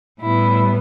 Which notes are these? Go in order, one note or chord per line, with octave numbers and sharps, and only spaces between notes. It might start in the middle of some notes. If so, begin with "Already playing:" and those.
A2 G3 B3 E4